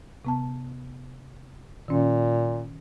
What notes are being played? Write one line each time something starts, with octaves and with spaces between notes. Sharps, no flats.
C3 B3 A5
A#2 D#3 C#4